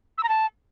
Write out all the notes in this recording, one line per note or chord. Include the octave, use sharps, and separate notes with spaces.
E6
A#5
A5